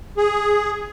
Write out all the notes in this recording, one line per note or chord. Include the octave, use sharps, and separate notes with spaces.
G#4